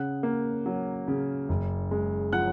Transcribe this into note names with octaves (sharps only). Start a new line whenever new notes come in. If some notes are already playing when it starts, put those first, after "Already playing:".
Already playing: C#3 F#5 F#6
A#3
F#3
C#3
F#1
G#3
F3 F#5 F#6